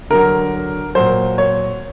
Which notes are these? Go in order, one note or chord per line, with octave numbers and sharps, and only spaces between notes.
D3 F#3 A#4
A#2 F#3 C5
C#5